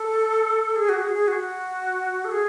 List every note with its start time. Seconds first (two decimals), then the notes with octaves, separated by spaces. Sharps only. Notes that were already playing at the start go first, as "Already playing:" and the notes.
Already playing: A4
0.76 G#4
0.89 F#4
1.02 G#4
1.14 G#4
1.28 F#4
2.25 A4
2.32 G#4